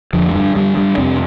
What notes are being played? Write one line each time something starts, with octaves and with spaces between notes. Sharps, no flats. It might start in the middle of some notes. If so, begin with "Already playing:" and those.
F2 D3 F3
A3
G2 G3
G2 D3 G3
G2 G3
F2 C3 C4